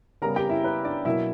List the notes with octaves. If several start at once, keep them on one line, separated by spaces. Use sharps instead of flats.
C#3 G3 B3 A#4 A#5
G4 G5
E4 E5
B4
D4 D5
B2 F#3 A#3 E4 E5